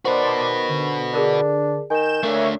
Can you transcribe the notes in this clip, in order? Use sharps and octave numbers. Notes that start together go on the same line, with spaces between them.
D#3 F#4 B4 C5 D5 A5 C6
D3
D4 G#4 A#4 D5
D#3 G#5 G6 E7
A3 A#3 D4 C#5 E5